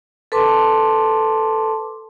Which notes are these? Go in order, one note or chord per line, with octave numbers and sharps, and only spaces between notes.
A4 B4 A5 C6 D6